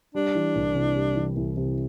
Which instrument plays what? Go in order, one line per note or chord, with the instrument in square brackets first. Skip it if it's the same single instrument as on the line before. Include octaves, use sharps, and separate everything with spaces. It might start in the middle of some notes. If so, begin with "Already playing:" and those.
[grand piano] G3 [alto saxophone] D4
[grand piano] E3
C2
C3
G3
E3
C2
C3